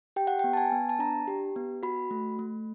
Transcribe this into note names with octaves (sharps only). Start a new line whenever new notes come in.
G4 G5
F#5
G5
B3
A5
G#5
B3
A5
D4 A#5
G4
B3
F#4 B5
A3
A3